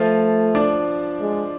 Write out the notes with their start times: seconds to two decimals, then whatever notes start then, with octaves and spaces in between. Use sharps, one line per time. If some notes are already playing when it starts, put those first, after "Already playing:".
Already playing: F3 A3 F4
0.55 D4 D5
1.20 G#3